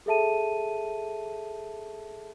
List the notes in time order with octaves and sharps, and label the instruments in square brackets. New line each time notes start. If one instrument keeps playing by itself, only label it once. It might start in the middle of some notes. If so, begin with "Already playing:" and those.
[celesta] G#4 A4 E5 A5 D#7